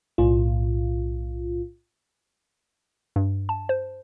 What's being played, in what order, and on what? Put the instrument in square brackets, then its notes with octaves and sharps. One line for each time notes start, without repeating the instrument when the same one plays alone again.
[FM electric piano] B1 A2 F4
[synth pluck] G2
A5
C5